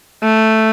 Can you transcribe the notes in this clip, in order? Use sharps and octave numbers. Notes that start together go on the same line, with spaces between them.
A3